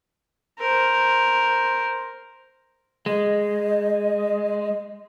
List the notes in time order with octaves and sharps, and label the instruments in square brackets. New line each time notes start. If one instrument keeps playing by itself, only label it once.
[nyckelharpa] A#4 C5
[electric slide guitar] G#3 [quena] D#5